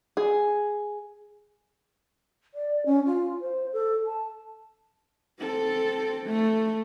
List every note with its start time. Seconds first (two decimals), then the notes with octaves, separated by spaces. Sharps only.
0.17 G#4
2.54 D5
2.86 C#4
3.06 F4
3.41 C5
3.73 A4
4.06 A5
5.40 C4 A4
6.26 A3